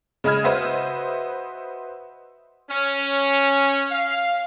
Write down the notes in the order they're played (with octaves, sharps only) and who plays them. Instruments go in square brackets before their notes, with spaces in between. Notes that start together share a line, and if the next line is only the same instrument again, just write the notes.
[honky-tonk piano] C#3 G#3 D#5 B5 F6 G#6
F#4 B4 C5 D#5 E5
[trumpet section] C#4
F5